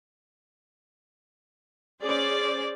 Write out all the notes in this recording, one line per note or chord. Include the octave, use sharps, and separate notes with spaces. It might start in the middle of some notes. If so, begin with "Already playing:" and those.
C#4 G#4 C5 D5